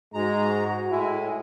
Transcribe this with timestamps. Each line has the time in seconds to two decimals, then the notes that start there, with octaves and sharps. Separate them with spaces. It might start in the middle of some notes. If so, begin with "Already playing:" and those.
0.14 G#2 G#3 F#4 A#5
0.91 A2 G#3 E4 G#5